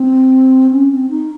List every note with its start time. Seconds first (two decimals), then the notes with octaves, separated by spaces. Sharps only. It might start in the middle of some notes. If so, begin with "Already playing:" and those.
Already playing: C4
0.71 C#4
0.91 C4
1.10 D#4